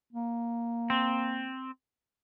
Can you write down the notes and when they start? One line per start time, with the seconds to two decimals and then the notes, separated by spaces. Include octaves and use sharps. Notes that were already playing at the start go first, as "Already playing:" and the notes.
0.13 A#3
0.90 C4